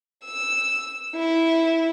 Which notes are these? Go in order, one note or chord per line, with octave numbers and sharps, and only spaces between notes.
E6
E4